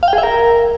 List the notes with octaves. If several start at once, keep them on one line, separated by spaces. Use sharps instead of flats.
F5
G5
G#4
E5
A#4